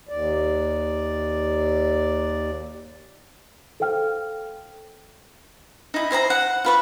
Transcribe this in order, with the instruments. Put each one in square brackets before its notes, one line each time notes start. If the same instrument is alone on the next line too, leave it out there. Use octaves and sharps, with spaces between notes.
[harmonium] D#2 D5
[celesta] A4 C5 F5 G5 F6
[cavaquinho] D#4 E4
E4 C5 G#5 A#5
F#5
F4 B4 C#6